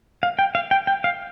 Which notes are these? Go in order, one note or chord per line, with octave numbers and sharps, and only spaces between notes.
F5
G5
F5
G5
G5
F5